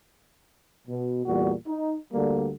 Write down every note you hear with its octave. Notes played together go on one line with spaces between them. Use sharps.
B2
E2 A#2 G3 F#4
D#4
D2 D3 G3 A#3